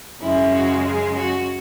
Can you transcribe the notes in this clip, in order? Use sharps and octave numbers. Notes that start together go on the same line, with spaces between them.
F#2 C#3 G#3 E4
F#4
G#4
F#4